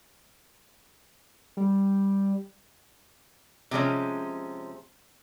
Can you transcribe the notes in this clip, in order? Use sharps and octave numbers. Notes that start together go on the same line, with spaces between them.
G3
C3 F3 G#3 C#4